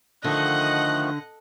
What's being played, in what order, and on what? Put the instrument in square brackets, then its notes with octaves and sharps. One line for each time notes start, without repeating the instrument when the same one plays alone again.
[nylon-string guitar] D3 [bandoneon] D#3 F3 A3 [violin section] D#5 F#5 [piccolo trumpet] F#6